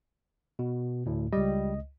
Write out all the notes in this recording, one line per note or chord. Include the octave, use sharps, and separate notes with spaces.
B2
D2 A2
C#2 G3 D#5